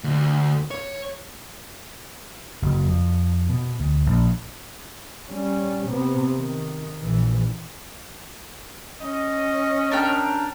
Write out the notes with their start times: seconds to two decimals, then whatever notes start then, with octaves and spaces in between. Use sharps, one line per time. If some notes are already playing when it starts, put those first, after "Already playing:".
0.04 D2
0.71 C#5
2.62 F#1
2.86 F2
3.49 B2
3.80 D2
4.06 A#1
5.30 G3 C#4
5.87 C3 B3
6.36 D#3
7.01 A#1 E3
9.00 C#4 D#5
9.91 D4 A#4 G5